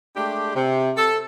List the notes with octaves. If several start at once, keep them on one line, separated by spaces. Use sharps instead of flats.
G#3 A3 D4 G4
C3
A4